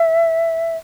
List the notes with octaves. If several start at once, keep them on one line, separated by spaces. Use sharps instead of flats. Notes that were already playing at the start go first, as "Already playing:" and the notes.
Already playing: E5